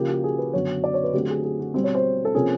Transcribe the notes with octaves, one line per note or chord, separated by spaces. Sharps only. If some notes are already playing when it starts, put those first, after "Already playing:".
Already playing: C#3 F3 A#3 G4
F#4
G#4
B4
F#2 D3 F#3 B3 C#5
D5
C#5
B4
D3 F#3 A3 C4 G4
G#4
G#4
F#4
B2 G3 C4 C5
C#5
C5
A4
C3 F3 A#3 C#4 G#4